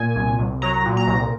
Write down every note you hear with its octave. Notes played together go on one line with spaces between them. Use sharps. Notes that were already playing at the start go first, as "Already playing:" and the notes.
Already playing: A#2 G#5
C2
C2
F#3 A#5
A#2
A#5
C2